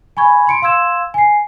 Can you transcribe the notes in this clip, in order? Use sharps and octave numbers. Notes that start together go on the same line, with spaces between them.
G#5 B5 C#6 G#6
C6 C#7 D7
F5 C6 E6 G#6 E7
G#5 C7